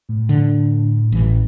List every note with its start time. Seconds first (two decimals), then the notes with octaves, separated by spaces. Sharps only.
0.09 A2
0.29 D3
1.12 A1 E3